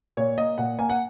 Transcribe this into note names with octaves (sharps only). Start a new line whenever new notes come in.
A#2 C#5
A#3 D#5
A#2 F#5
A#3 G#5
F#5